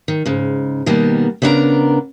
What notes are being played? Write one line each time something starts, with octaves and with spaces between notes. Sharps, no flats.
D#3
G#2 C#3
B2 D#3 G3 A#3 B3
C#3 B3 D4 E4 A#4 A#5